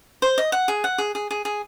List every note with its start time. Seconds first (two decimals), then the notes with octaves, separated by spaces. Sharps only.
0.22 C5
0.38 D#5
0.52 F#5
0.68 G#4
0.84 F#5
0.98 G#4
1.15 G#4
1.31 G#4
1.45 G#4